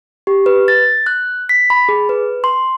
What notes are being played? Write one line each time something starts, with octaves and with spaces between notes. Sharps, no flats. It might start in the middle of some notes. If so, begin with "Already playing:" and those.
G4
B4
A6
F#6
B6
B5
G#4
B4
C6